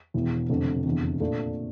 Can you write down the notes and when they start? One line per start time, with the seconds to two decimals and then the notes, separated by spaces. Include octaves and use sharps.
0.14 E1 E2 E3
0.49 F1 F2 D3 A3
0.85 F1 E2 D3
1.20 A#2 A3 D4